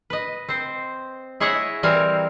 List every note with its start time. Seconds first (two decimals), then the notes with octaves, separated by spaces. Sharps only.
0.10 B4 D#5
0.49 C4 C5
1.40 E4 G#4 C#5 D#5 E5 F#5
1.83 E3 G3 C4 A#4 G#5